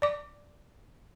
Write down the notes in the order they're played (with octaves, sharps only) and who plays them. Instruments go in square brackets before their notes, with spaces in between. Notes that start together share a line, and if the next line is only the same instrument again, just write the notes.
[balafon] D5 D6